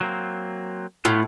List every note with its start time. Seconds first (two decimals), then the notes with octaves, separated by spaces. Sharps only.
0.01 F#3 A#3 C4
1.05 A2 B3 F4